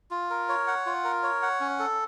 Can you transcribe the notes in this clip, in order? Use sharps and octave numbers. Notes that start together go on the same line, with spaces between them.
F4
A#4
C#5
F#5
F4
A#4
C#5
F#5
C#4
A4